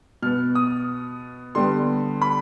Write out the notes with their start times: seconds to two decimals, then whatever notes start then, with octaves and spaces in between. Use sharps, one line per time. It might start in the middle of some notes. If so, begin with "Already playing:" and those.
0.22 B2 B3 F6
0.55 D#6
1.55 D3 G3 B3 C6
2.22 B5